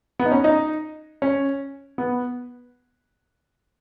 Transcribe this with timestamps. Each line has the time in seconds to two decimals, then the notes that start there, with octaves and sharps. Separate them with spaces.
0.19 B3
0.26 D#4
0.31 C#4
0.44 D#4
1.22 C#4
1.98 B3